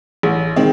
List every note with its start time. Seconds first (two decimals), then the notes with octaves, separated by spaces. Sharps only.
0.23 A1
0.56 D#3 G#3 C4